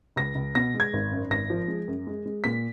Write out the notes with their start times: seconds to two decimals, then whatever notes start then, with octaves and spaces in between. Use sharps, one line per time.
0.16 C#2 A#6
0.35 C#2
0.55 B2 A#6
0.74 G#3
0.80 G#6
0.93 G#1
1.11 F#2
1.30 G#1 A#6
1.50 F3
1.68 G#3
1.88 F#2
2.07 G#3
2.26 G#3
2.44 A#2 B6